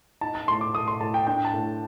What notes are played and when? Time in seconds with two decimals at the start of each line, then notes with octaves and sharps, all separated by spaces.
0.21 D#4 A5
0.35 A5
0.48 A2 C6
0.61 D6
0.75 A3 D#6
0.88 C6
1.01 A2 A5
1.14 G5
1.27 D4 G5
1.45 A5
1.54 A2